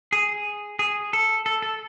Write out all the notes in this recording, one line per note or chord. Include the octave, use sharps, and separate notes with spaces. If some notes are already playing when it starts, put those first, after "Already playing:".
G#4
G#4
A4
A4
A4